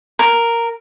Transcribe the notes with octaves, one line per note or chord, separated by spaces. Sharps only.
A#4